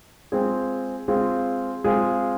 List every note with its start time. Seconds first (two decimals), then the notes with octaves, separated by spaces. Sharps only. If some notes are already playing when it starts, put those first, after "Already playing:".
0.32 G#3 C4 F4 G#4
1.08 G#3 C4 F4 G#4
1.84 G#3 C4 F4 G#4